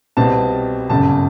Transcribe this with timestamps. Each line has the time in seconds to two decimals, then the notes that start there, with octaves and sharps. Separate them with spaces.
0.17 C2 B2 G3 C4 A5
0.89 G1 F#2 C#3 A5